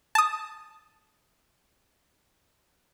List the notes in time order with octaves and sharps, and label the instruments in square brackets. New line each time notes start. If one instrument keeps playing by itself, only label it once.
[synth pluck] A5 D#6